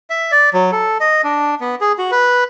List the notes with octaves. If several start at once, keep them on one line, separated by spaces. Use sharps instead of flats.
E5
D5
F#3
A4
D#5
D4
B3
G#4
F#4
B4